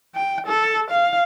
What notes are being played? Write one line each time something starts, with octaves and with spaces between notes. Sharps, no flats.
G5
A4
F5